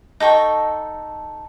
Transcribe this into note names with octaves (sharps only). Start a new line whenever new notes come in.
D#4 A4 G5 C#6